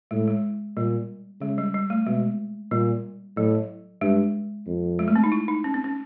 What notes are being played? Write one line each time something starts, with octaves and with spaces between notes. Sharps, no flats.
A2 G#3
G#3
A#2 G3
C#3 G#3
G3
G3
A3
B2 G#3
A#2 G3
A2 F#3
G2 G#3
F2
G#3
A3
C4
D#4
E4
D#4
C#4
C4
C#4